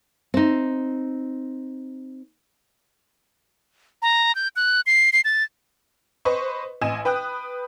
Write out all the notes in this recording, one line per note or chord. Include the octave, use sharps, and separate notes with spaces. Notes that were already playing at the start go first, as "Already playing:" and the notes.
C4 D#4
A#5
G6
F#6
C7
C7
A6
B4 C5 D#5 C#6
A1 D#5 G#5 E7
B4 G5 D#6 F#6